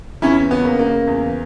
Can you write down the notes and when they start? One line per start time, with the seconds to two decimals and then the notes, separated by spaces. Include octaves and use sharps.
0.22 E2 C#4 E4
0.51 C#3 B3
0.65 A#3
0.79 C#3 A#3
1.07 E2